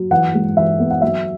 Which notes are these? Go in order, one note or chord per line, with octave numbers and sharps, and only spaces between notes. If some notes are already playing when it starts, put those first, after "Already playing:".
Already playing: F#3
E3 F#5
G#3
E3 E5
B3
F#5
F#3 E5